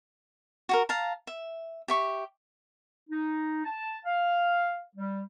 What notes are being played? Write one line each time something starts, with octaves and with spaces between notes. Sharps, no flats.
F#4 G4 A#4
F5 A5 A#5
E5
G4 E5 C#6
D#4
A5
F5
G3